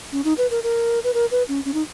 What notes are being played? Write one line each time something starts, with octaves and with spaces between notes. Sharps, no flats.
C#4
D#4
B4
A#4
A#4
B4
A#4
B4
C#4
C#4
D#4